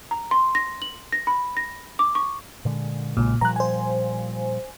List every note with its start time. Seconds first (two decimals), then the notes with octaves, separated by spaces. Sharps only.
0.11 A#5
0.31 C6
0.55 A#6
0.82 F#7
1.12 A#6
1.27 B5
1.57 A#6
1.99 D6
2.15 C#6
2.65 A#2 D3 G#3
3.17 B1 A#2 C#3 G#3
3.41 A#2 F3 G3 A#5 F#6
3.56 C5 G#5